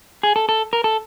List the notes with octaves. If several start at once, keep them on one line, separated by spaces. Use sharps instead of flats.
G#4
A4
A4
A#4
A4